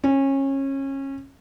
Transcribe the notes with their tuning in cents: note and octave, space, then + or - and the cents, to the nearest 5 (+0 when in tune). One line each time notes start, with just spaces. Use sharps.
C#4 -25